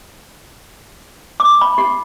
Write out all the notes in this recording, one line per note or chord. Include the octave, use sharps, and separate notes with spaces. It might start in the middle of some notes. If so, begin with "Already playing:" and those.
D6
B5
G4